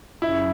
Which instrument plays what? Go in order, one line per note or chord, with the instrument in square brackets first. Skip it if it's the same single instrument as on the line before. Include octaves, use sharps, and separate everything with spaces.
[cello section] F#2 C#3 [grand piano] E4